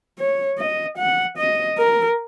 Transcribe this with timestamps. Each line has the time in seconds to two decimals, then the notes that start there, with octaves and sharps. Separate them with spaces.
0.18 C#5
0.59 D#5
0.98 F#5
1.38 D#5
1.78 A#4